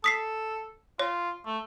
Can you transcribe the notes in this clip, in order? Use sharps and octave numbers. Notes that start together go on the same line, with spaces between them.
A4 D#6 B6 C7
F4 C#5
A3